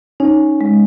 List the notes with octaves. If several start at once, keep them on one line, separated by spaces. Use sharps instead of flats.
C#4 D#4
G#3